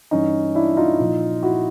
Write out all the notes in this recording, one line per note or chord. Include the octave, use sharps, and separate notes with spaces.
G2 E3 C#4 D#4
D4 E4
D#4 F4
A#2 F3
E4 F#4